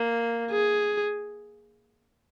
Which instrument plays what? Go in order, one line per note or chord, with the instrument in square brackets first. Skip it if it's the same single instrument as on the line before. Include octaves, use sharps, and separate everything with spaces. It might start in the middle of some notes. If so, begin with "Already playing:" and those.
Already playing: [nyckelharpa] A#3
[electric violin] G#4